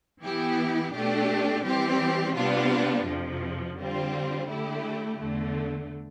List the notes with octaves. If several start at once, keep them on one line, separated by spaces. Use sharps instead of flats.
E3 B3 E4 G4
B2 A3 D4 G4
E3 G3 C4 G4
C3 G3 B3 D4 F4
F2 C3 F3
D3 G3 C4 F4
D3 A3 E4 G4
E2 D3 A3